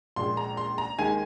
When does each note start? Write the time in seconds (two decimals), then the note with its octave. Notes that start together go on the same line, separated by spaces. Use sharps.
0.16 A#1 A#2 G#3 C6
0.37 A#5
0.57 C6
0.78 A#5
0.99 D#2 D#3 G#3 G#5